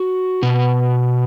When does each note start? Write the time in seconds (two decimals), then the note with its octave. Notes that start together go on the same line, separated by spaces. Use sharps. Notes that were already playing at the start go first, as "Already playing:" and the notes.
Already playing: F#4
0.43 B2